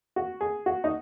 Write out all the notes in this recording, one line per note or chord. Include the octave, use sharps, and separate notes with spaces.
F#4
G#4
F#4
D#4